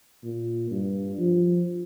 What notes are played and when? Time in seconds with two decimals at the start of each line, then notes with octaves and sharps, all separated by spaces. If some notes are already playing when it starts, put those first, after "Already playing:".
0.24 A#2
0.71 G2
1.19 F3